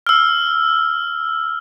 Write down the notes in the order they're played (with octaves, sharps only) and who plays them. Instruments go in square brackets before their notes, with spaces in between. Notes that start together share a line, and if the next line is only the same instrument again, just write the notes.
[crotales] E6 F6